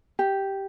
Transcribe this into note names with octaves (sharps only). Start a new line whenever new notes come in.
G4